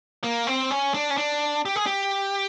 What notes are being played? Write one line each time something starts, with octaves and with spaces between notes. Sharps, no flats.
A#3
C4
C#4
D4
C#4
D4
G4
G#4
G4